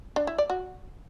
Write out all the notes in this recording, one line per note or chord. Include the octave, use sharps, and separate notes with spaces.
D4
E4
D5
F#4